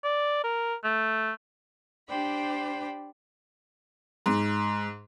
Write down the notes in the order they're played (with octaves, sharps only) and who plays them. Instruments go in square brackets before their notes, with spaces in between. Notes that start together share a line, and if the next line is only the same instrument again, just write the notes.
[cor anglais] D5
A#4
A3
[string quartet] D4 G4 C5 D5 G5 B5
[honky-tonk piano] G#2